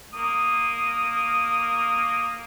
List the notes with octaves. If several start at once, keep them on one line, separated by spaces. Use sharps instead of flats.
A#3 D#6